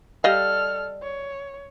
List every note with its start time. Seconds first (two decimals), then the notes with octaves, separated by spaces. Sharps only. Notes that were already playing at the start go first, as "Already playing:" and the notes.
0.24 G3 A4 D#5 F5 F6
1.02 C#5